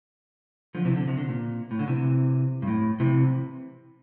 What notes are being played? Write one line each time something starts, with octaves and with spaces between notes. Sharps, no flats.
D3 F3
C3 E3
D3
C3
D3
A#2
A2
D3
C3 E3
G2
A2
C3 E3